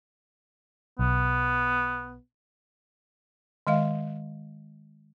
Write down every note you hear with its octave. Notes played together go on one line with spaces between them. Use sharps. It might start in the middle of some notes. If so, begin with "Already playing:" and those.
B1 B3
D#3 G#3 D#5 F5